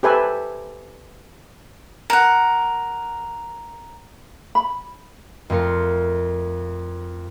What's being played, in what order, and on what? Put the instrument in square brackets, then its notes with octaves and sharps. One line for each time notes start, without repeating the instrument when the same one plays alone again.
[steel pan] G4 A4 B4 C5 E5 G#5
[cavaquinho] A#4 F#5
[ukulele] B5
[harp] F2 A3 F4 A#4 C#7